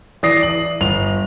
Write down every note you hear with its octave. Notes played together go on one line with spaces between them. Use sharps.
E3 D5 D#6 A#6 C7
F#7
G1 F7